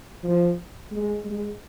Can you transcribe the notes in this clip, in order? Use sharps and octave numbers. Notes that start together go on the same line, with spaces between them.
F3
G#3
G#3